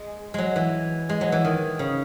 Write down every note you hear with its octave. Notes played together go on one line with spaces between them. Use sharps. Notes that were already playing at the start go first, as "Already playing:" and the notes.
Already playing: G#3
F#3 G#3
E3
G#3
F#3
E3
D#3
C#3